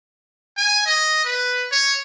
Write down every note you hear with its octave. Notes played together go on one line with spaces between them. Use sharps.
G#5
D#5
B4
C#5